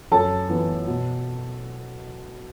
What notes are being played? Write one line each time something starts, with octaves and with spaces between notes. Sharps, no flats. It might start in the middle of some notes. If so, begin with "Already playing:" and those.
F#2 A4 A5
E3 B3
B2